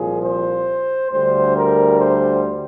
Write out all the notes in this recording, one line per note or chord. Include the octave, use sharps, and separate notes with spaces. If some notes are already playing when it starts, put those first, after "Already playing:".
Already playing: C2 A#2 F3 G#4
C5
D2 D3 G3 C5
A#4
C5